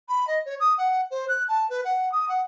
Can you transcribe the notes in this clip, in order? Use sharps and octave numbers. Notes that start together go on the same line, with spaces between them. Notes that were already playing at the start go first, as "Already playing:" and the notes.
B5
D#5
C#5
D#6
F#5
C5
F#6
A5
B4
F#5
D#6
F#5